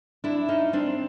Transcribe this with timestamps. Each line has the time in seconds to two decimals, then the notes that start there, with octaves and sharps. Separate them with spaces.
0.24 D4 E4
0.48 C#4 D#4
0.73 C4 D4